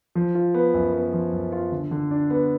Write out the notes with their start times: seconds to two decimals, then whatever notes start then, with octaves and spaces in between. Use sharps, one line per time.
0.15 F3
0.35 F4
0.54 B3
0.74 F#2
0.93 B3
1.13 F3
1.33 F#2
1.52 F4
1.72 D3
1.91 D3
2.11 D4
2.30 B3